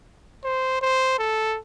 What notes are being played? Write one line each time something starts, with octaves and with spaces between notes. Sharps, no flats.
C5
C5
A4